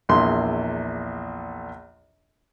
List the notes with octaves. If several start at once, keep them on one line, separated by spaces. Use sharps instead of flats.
A#1 E2 C6